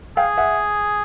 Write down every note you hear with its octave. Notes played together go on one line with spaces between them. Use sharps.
G#4 F5 G5
E5 F#5